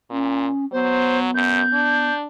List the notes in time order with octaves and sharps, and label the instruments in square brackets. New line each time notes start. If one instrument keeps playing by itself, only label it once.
[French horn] A#2 [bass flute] C#4
[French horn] F#3 [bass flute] B3 [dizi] C5
[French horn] F#2 [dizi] G6
[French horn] D4